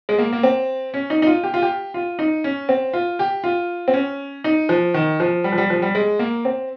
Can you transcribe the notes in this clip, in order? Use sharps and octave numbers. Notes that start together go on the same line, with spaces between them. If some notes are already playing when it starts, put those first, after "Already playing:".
G#3
A#3
A#3
C4
C#4
D#4
D#4
F4
G4
F4
G4
F4
D#4
C#4
C4
F4
G4
F4
C4
C#4
D#4
F3
D#3
F3
G3
F3
G3
F3
G3
G#3
A#3
C4